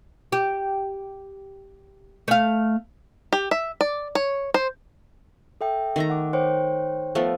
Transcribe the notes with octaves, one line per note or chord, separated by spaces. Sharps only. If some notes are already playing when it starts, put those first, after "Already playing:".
G4
A3 F5
G4
E5
D5
C#5
C5
A4 E5 G5
D#3 A3 A#5
F#5 D6
C5 C#5 G5
F3 A3 B3